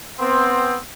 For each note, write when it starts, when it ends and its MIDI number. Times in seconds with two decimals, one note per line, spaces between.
0.19 0.75 59
0.19 0.75 60